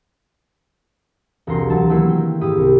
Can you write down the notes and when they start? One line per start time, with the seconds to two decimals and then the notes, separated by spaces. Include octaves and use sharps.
1.47 E1 C2 A#5 C6
1.69 D2 F#3 A5 A6
1.89 D#3 F#3 A3 A#3 C#4 E4
2.08 A#4 G5
2.41 G#2 E4 G4 D#6
2.58 C2